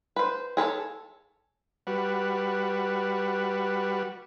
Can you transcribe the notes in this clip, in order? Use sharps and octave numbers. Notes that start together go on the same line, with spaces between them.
B4 C5
G#4 A4 B4 C#5
G3 F#4 B4